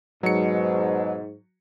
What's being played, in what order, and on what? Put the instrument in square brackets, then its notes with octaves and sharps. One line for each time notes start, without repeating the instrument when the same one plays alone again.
[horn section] G#2 [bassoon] B2 [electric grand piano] F#3 C#7